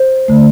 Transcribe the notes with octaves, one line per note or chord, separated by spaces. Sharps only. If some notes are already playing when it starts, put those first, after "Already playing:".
Already playing: C5
D3 A3